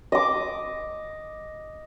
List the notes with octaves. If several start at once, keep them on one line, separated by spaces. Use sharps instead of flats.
D#5 D6